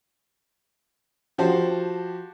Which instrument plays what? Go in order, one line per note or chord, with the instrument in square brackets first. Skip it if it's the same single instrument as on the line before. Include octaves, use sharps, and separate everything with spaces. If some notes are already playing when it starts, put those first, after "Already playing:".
[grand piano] F3 F#4 G4 C5 A5